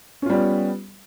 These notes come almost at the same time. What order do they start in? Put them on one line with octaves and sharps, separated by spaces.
C#4 F4 G3 B3